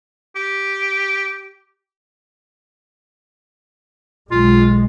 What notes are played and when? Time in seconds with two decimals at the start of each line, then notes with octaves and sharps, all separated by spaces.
0.36 G4
4.31 B1 G#3 F4